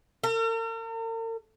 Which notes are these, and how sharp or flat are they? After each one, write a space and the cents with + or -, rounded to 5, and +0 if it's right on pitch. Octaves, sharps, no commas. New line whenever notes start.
A#4 -45